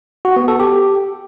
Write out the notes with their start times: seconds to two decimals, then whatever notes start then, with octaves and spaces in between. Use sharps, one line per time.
0.25 F#4
0.36 B3
0.48 A4
0.60 G4